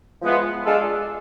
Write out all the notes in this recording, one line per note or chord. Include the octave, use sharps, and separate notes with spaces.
F3 G#3 B3 E4
G#3 D4 F4 A4